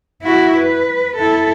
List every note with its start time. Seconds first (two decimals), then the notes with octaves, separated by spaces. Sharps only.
0.23 E4 F#4
0.57 B4
1.16 E4 A4